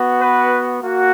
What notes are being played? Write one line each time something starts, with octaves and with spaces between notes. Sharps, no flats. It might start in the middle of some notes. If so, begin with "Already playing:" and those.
Already playing: B3 F#4
B4
A#3 F#4